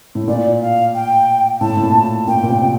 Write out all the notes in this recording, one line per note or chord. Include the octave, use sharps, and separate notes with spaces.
A2
A#2 D5
F5
G5
A2 A5
A2
A#2
A#2 G5
A#2
C3
C3